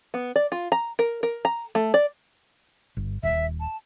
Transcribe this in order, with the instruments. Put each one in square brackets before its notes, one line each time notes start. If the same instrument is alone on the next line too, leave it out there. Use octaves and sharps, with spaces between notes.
[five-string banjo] B3
D5
F4
A#5
A#4
A#4
A#5
A3
D5
[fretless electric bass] G1
[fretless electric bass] D#1 [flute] E5
[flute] A5